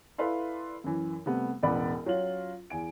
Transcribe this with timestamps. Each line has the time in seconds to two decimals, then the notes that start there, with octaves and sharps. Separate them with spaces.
0.18 E4 A4 B4 D5 F5 C6
0.84 F#2 E3
1.26 C3 G3 A3 B3
1.63 E1 A1 B3 D5 B5
2.06 F#3 C#4 F4 F#7
2.70 E2 G#5 D7